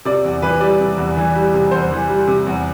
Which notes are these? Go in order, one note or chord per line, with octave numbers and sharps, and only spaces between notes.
C3 D5
E2
E3 B4
G3 D5
C3
E2
E3
G3
C3
E2 C5
E3
G3
C3
E2